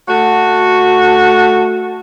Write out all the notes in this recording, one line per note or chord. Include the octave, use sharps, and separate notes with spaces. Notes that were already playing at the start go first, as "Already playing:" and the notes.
A3 F#4